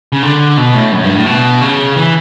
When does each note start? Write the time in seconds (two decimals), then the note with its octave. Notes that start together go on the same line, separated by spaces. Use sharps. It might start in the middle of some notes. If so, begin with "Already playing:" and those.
0.13 C#3
0.22 D3
0.57 B2
0.75 A2
0.92 F#2
1.04 G2
1.15 A2
1.26 B2
1.61 C#3
1.96 E3